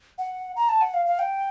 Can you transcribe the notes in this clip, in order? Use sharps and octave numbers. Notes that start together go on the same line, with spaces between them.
F#5
A#5
A5
F#5
F5
F5
G5